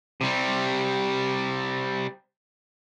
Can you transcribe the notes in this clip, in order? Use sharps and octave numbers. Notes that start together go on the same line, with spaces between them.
C3 G3